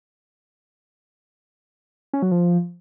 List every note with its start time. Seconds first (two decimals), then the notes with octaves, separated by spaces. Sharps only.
2.13 C#4
2.22 F#3
2.31 F3